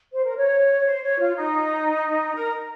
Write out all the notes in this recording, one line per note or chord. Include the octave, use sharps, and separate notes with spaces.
C5
A#4
C#5
C5
C#5
F4
D#4
A#4